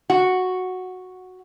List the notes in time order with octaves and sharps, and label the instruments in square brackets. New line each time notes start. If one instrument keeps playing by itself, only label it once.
[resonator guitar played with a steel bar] F#4